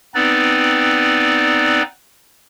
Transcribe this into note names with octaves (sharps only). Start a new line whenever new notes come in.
B3 C4 D#4 B4 D5